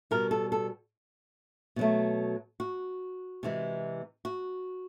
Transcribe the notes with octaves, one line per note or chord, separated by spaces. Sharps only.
B2 G3 A#4
A4
A4
B2 F#3 A3
F#4
C3 E3 G#3
F#4